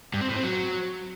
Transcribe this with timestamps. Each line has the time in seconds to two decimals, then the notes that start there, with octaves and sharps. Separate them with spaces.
0.14 G2
0.21 C4
0.29 A2
0.36 C4
0.43 F#3